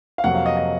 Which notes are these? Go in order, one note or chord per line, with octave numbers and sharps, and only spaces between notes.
F5
F2 C3 F#3 A#3 F#5
F5
D#5
D#5